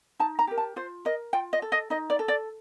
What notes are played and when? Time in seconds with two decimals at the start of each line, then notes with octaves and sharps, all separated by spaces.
0.19 D#4 A5
0.39 A#5
0.47 G4 A#4
0.58 A5
0.76 F4 C5
1.05 A#4 D#5
1.33 F4 G5
1.53 D#5
1.62 A4
1.72 D#5
1.90 D#4 D#5
2.10 D5
2.19 A4
2.28 D5